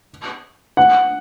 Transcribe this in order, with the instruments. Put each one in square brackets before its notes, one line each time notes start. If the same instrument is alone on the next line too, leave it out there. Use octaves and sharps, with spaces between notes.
[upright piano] F#5